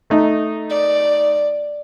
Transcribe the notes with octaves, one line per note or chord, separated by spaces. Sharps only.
A3 D#4
D5